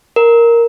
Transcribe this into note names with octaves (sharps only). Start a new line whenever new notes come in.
A#4